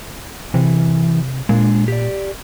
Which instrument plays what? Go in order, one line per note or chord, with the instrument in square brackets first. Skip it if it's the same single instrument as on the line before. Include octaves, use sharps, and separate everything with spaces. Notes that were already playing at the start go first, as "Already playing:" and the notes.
[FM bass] C3 [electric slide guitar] E3
[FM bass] A#2 [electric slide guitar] G#3 D4
[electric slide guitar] G4 D5